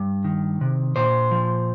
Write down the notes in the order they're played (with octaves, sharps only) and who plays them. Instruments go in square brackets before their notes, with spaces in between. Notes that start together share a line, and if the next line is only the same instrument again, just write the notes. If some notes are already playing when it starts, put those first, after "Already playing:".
Already playing: [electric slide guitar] G2
D#3
C3
A#2 C5
F3